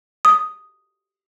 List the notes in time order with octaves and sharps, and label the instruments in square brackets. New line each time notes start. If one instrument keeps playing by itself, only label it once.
[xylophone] D#6